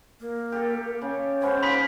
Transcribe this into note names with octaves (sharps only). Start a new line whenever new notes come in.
A#3
G4 A4
C#3
G#3 B3 C#4 C5
A#3 D#4 A#4 B5 C6 B6